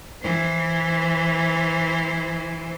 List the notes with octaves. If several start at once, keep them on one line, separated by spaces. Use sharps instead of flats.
E3 C5